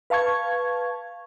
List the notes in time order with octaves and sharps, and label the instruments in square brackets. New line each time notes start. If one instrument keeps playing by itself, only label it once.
[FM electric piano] B4 F5 A5 C#6 G#6